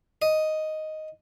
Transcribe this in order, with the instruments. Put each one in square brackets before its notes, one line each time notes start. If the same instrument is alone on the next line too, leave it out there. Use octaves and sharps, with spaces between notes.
[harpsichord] D#5